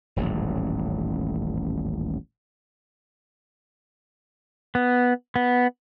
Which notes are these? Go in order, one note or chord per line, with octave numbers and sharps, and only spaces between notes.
D#1 A1 G#2 F#3
B3
B3